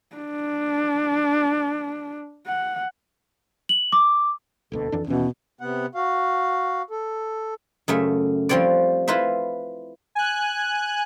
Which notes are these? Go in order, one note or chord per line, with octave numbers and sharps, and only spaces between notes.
D4
F#5
F#7
D6
D#1 D2 B2 A4
F2 E3 D4
D#2 B2 E3 C#4
C3 B3 F#5
F#4 F5
A4
F#2 C#3 A3 E5
F3 G3 C4 C#5 D5
E4 F4 B4 C5 E5
G#5 F#6